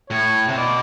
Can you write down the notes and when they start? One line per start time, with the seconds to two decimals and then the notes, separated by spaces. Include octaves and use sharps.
0.10 A2 C#5
0.48 C3
0.57 B2 D5